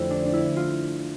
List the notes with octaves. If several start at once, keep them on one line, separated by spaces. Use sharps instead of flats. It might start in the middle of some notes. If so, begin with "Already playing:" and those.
Already playing: F2 D3 A3 E4 G4
D4
D4
E4
F4